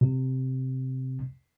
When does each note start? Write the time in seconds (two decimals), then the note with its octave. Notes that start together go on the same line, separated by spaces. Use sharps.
0.01 C3